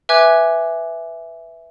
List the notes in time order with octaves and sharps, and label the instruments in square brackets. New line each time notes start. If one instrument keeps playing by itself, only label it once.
[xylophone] B4 E5 G#5 D6 F#6 G#6